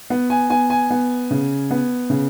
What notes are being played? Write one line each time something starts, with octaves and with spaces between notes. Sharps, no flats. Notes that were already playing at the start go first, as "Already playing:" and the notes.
B3
G#5
B3 G#5
G#5
B3
C#3
B3
C#3